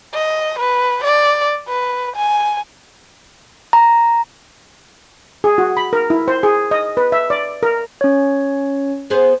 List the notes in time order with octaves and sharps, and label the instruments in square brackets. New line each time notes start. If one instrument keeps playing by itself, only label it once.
[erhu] D#5
B4
D5
B4
G#5
[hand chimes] A#5
[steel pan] G#4
F#4
B5
A#4
E4
C5
G#4
D#5
B4
E5
D5
A#4
[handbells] C#4 C#5
[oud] B3 G#4 C5